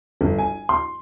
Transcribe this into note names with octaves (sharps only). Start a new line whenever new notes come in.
G1
G#5
C6